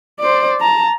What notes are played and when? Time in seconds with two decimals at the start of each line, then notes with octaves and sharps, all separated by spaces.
0.20 C5 D5
0.60 A5 A#5